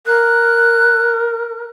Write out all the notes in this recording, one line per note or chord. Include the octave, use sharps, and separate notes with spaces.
A#4 F#6